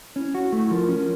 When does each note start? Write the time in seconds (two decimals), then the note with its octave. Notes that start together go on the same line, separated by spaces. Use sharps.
0.16 C#4 E4
0.35 F#4
0.52 A3
0.70 F3 A#4
0.89 C#4